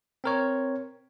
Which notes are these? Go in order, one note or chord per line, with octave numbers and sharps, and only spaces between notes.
C4 A#4 C#5